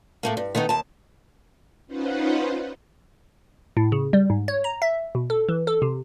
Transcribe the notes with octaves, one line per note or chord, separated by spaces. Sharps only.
A2 A3 A#3
G2
D#3 A3 B3 D#4
D#2 A5
C#4 D#4 F4 B4 C5 F#5
A2
C#3
G3
G#2
C#5
A#5
E5
B2
A4
E3
A4
C3